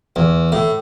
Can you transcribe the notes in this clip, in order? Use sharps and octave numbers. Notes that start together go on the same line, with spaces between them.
E2
A2